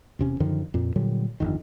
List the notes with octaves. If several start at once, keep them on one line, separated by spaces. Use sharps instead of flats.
E1 C3 C#4
F#2 D3 D#3 F3
F2 A#2
A#2 D3 F#3 G3
G1 F2 D#3